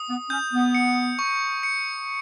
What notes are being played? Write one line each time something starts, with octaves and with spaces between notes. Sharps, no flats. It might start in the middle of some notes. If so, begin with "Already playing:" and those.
Already playing: D#6
B3
C#4 G6
B3
C#7
C#6
C#7